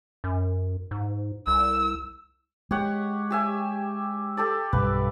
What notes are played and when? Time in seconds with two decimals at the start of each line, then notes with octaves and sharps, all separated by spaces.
0.24 F#2
0.91 G#2
1.47 C2 E6
2.71 G#3 G4 C#5 F#5
3.30 G4 E5 G#5
4.37 G4 A4 D5
4.73 B1 G2 B4